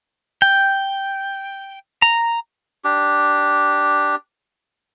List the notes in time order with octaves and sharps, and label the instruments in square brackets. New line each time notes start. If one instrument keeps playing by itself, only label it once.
[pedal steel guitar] G5
A#5
[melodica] D4 G4